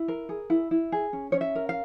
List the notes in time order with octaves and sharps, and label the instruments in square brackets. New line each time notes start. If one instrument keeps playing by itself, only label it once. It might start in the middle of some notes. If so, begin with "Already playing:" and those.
Already playing: [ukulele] E4
A#4
G#4
E4
E4
G#4
C#4
C#4 C#5
E5
A#4
F5